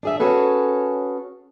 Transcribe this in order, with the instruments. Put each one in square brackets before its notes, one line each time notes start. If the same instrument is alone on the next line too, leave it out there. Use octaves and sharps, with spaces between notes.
[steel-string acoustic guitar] D4 G#4 E5
C#4 F#4 G#4 A4 B4